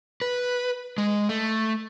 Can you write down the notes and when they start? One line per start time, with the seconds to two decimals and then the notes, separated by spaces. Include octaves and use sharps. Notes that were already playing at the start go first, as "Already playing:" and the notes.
0.22 B4
0.98 G#3
1.29 A3